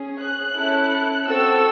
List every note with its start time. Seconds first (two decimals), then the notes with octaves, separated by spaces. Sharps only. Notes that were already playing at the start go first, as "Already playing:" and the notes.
Already playing: C#4 G#4
0.21 F#6
0.56 C#4 E4 A4
1.26 C4 F#4 A4 E6